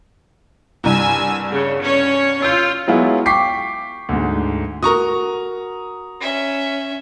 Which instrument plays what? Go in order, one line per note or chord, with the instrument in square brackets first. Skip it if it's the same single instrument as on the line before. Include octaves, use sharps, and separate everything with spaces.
[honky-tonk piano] C2 G2 [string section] G#5 E6
[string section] C#3
C#4 C#5
[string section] F4 [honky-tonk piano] E6 G6
[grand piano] F#3 G#3 B3 E4 F4
G5 C#6 D6 B6 C7
D2 G#2
[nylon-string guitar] F#4 A#4 [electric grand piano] A#5 C#6 D#6
[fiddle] C#4 E5